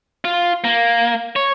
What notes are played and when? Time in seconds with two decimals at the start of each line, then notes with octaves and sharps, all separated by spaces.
0.25 F4
0.64 A#3
1.36 C#5